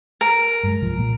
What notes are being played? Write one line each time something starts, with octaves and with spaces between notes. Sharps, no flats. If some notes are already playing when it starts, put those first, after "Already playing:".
A#4
G2 G#3
C2 F3
A#2